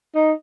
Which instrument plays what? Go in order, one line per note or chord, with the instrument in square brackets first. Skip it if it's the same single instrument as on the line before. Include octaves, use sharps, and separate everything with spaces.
[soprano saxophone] D#4